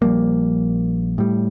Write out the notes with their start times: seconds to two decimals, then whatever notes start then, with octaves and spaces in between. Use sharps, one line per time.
0.02 A#1 F3 G3 A#3
1.18 A2 G3